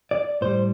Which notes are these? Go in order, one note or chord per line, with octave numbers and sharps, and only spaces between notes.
D5
A2 G3 C5